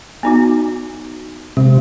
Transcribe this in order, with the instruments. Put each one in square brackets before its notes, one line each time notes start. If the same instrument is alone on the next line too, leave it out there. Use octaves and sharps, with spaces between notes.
[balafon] B3 D#4 F#4
[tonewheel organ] C3 [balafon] G#3